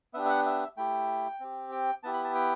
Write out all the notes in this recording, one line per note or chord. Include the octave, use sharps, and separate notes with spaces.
B3 D4 G4 E5
E5
F#5
E5
A3 E4 G4 G5
C4 G4
G5
B3 E4 G4 A5
B5
A5
G5